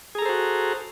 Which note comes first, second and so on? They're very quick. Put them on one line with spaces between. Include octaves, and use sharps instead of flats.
G#4 A#5 A4 C5 F#4